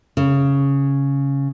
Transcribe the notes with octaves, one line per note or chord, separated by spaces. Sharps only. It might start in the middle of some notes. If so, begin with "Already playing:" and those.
C#3